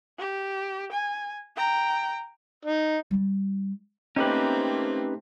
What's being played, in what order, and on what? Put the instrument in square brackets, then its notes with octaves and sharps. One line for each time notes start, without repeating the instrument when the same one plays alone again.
[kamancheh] G4
G#5
G5 A#5
[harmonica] D#4
[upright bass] G3 D#4
[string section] A3 A#3 C4 [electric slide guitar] C#4 B4 [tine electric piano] D#4 G4